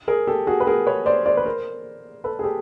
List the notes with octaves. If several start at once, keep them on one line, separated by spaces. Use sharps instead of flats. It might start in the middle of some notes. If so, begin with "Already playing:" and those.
G#4 A#4
G4 A4
F#4 G#4
B4
G#4 A#4
B4 C#5
C5 D5
C5 D5
B4
A#4 C5
A4 B4
G#4
G4 A4